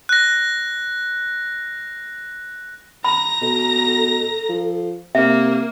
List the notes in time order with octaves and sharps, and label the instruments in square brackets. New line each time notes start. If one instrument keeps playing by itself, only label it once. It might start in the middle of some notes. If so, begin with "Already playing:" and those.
[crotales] F#6 A#6
[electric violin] A#5 A#6 [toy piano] B5
[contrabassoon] B2 [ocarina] A4
[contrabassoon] F3
[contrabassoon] C3 [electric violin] A#3 [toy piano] E5